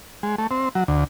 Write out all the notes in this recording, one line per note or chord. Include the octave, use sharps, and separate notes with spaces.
G#3
A3
C4
F#3
D2